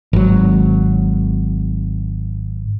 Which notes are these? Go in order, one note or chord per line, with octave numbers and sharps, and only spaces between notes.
G#1 F#3